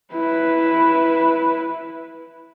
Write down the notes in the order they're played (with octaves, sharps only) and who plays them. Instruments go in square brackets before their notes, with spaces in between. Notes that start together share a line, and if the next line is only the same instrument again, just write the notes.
[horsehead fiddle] E4 B4